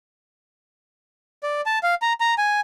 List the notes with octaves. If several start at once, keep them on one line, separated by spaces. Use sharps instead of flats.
D5
A5
F5
A#5
A#5
G#5